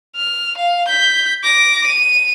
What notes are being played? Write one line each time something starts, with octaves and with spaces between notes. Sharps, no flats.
F6
F5
G6 B6
D6 A#6
D#7